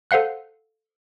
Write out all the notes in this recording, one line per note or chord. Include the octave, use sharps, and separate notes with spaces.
A4 C5 F5 F#5 F#6